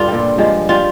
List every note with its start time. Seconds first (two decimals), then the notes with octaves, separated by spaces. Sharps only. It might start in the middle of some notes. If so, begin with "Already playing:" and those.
Already playing: G2 D3 D4 F4
0.08 A#2 G3
0.38 G2 F3 G#3
0.69 G3 F4